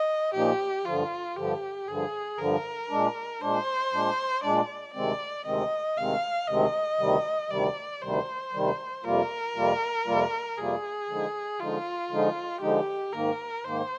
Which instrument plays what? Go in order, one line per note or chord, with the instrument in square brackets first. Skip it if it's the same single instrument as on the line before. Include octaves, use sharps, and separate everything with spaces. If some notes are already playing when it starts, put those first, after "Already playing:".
Already playing: [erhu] D#5
[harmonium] A#2 F3 A#3 D#4 [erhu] G4
[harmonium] G2 D3 F3 [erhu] F4
[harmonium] G2 D3 F3 [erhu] G4
[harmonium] G2 D3 F3 [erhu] G#4
[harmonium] G2 D3 F3 [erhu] A#4
[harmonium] A#2 G#3 D4
[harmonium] A#2 G#3 D4 [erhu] C5
[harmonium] A#2 G#3 D4
[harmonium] A#2 G#3 D4 [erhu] D5
[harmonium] D2 C3 D#3 G#3 C4 [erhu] D5
[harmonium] D2 C3 D#3 G#3 C4 [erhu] D#5
[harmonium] D2 C3 D#3 G#3 C4 [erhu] F5
[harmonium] D2 C3 D#3 G#3 C4 [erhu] D#5
[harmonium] D2 C3 D#3 G3
[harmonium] D2 C3 D#3 G3 [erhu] D5
[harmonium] D2 C3 D#3 G3 [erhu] C5
[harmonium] D2 C3 D#3 G3
[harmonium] F2 C3 G3 A#3 F4 [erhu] A#4
[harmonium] F2 C3 G3 A#3 F4
F2 C3 G3 A#3 F4
[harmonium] F2 C3 G3 A#3 F4 [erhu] G#4
[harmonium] D3 F3 G#3 D#4
[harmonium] D3 F3 G#3 D#4 [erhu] F4
[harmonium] D3 F3 G#3 D#4
[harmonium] D3 F3 G#3 D#4 [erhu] G4
[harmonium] G#2 D#3 A#3 [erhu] A#4
[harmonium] G#2 D#3 A#3 [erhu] C5